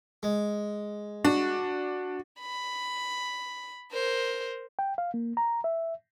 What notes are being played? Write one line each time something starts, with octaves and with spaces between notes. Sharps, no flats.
G#3
D4 F#4
B5
A#4 C5
G5
F5
A#3
A#5
E5